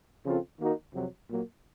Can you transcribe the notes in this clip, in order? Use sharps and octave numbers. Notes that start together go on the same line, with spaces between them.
C#3 F3 C4 F4 A4
D#3 A#3 D#4 F#4 A#4
F2 C3 F#3
A#2 F#3 A#3